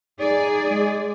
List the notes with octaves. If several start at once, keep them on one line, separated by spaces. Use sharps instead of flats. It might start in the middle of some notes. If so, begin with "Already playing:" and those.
D#4 G#4 D5
G#3